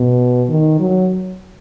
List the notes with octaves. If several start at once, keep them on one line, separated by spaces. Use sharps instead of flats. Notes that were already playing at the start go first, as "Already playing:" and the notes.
Already playing: B2
D#3
F#3